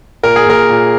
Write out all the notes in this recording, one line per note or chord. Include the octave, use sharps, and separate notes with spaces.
A#2 A#4
G#4
A#2 A#4
A#2